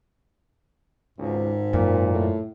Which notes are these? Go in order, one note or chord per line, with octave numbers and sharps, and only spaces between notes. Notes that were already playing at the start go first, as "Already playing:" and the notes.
G#1 C#2 G#2
F#2 A#2
A2